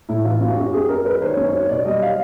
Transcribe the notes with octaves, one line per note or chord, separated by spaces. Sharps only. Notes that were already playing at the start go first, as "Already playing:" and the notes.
A2 E4
E3 F4
F#2 F#4
F#2 G4
F#2 G#4
F#2 A#4
F#3 B4
D#3 C5
C#5
F#2
F#3 C#5
B2 D5
G3 D#5
F5